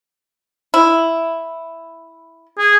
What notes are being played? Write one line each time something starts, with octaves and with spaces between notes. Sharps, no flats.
E4
G#4